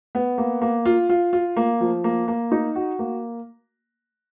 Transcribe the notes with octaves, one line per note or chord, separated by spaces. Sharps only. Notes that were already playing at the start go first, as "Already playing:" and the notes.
B3
A#3
A#3
F4
F4
F4
A#3
F3
A#3
A#3
D#4
F#4
A#3